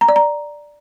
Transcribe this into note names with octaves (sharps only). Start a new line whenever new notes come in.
A#5
D5
A#5